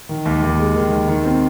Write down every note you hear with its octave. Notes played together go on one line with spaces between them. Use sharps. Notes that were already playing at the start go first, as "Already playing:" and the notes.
D#3
D#2
D#2
G#3
D#3
D#2
D#3
C4